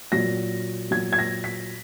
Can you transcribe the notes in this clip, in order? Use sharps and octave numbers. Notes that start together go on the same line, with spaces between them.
A#2 F#3 A#6
A#2 F#3 G#6
G#6
A#6
B6